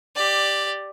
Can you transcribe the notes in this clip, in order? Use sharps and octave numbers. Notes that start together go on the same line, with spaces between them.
G4 D5